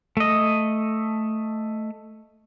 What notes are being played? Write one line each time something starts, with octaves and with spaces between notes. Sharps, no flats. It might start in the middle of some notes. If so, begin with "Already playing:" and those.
A3 D#5